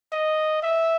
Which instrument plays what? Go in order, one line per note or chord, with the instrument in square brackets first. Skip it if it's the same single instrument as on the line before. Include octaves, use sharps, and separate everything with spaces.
[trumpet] D#5
E5